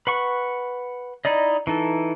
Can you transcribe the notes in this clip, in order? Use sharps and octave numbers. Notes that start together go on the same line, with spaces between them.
B4 F#5 C#6
D#4 E4 D5 D#5
E3 D#4 A4